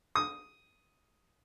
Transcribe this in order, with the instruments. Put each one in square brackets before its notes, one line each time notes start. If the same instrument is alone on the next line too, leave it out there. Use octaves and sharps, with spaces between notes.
[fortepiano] D#6